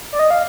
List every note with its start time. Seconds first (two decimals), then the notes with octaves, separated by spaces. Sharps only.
0.13 D5
0.19 D#5
0.30 F5